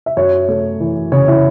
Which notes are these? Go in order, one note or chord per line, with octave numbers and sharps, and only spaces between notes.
E5
F#2 C#5
A3
E3
C#3 C#5
E4